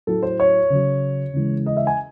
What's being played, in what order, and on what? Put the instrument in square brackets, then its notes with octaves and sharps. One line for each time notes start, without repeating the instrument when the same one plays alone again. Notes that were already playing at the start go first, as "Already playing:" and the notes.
[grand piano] A2 F#3 A4
C5
C#5
C#3 F#3
C#3 E3 G#3
D#5
E5
G#5